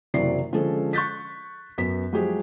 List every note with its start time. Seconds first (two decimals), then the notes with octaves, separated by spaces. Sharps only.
0.14 F#1 C3 E3 F#3 D5 C7
0.52 D3 F3 G#3 C#4 A4
0.93 C#6 F#6 G6 A6 B6
1.78 F#2 B3 B6
2.13 F3 F#3 G#3 G4 G#4